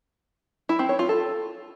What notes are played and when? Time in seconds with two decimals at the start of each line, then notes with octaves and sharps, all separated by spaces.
0.69 E4
0.79 C4
0.89 C#5
0.99 F4
1.09 A4